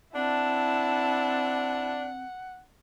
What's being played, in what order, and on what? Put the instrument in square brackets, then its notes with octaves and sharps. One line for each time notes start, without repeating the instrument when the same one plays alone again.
[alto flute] C4 [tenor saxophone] D4 [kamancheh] E4 A5 [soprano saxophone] F#5